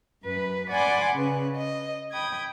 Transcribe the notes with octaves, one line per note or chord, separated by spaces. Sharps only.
F#2 B4
D5 F#5 G#5 B5 C6 D6
C#3 B4
D#5
G5 B5 D#6 G#6